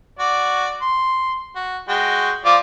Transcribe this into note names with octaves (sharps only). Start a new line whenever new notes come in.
F#4 D5
C6
F#4
G#3 F#4 G5
F3 F4 D5